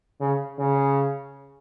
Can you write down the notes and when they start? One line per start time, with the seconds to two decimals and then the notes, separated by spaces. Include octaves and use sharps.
0.20 C#3
0.59 C#3